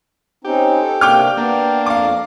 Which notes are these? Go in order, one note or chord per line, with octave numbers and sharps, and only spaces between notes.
C4 C#4 D#4 G4
A4
C3 A#3 D4 G5 D6 F6
A#3 B3 D4
F2 F5 D6